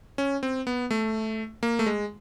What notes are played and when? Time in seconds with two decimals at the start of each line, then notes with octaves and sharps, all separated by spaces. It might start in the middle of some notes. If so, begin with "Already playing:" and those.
0.18 C#4
0.43 C4
0.67 B3
0.91 A3
1.63 A#3
1.79 A3
1.86 G#3